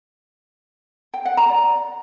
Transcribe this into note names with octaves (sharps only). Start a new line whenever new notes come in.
G5
F#5
A#5
D5